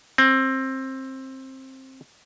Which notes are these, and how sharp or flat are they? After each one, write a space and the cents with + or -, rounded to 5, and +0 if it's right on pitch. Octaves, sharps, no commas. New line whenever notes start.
C4 +20